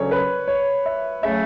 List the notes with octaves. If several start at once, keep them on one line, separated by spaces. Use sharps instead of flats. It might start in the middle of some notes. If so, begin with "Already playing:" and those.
Already playing: D2 C#3 F#3 C#4 C#5
B4
C#5
E5
C#3 F#3 A3 E5